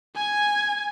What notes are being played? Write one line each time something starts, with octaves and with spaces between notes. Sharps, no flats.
G#5 G#6